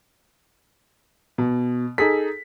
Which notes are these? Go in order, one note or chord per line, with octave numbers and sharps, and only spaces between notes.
B2
D#4 G#4 A4 B6